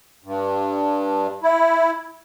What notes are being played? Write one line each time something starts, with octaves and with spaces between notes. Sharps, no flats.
G2
E4